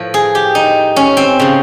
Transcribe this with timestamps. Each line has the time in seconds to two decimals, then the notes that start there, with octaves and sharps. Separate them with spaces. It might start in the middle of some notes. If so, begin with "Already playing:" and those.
Already playing: A2 F3 B4
0.14 G#4
0.35 G4
0.55 D#4
0.96 C#4
1.17 C4
1.39 C#3 F3